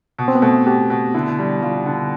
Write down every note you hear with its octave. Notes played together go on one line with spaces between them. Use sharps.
B2
C4
B3
B2 A3
B2 G4
B2
D3 E4
G3
G3 F4
D3